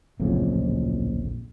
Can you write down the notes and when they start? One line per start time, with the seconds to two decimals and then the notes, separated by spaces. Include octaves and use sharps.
0.20 D1 A#1 F2 C#3